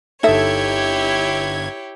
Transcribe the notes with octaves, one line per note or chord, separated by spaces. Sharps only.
G1 D#4 E4 G4 A4 C#5 E5 G#6